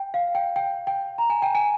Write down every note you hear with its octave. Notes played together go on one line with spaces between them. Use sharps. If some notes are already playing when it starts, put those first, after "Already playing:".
Already playing: G5
F5
G5
G5
G5
A#5
G#5
G5
G#5